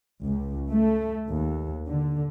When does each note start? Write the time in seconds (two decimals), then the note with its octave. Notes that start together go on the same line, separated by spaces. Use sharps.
0.23 C#2
0.70 A3
1.29 D#2
1.86 D3